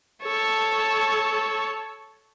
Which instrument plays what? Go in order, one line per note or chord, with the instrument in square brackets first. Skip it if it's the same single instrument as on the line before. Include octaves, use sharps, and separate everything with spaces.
[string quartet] A4 C#5 A5